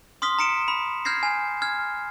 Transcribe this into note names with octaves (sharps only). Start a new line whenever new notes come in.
C6 D#6 F6 B6 G7
A#5 B6 C#7 D7 E7
B5
F6 G6 G#6 A#6 C7
G#5
F6 G#6